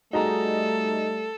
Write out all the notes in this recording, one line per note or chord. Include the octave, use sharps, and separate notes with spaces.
G3 A3 D#4 F#4 G#4 A4 A#5